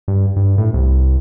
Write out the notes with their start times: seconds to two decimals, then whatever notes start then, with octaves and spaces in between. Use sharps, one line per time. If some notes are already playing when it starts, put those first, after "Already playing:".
0.08 G2
0.36 G2
0.58 A2
0.74 C2